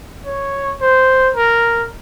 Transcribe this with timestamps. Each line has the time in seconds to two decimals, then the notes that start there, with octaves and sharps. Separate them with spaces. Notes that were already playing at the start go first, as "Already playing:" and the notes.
0.26 C#5
0.81 C5
1.35 A#4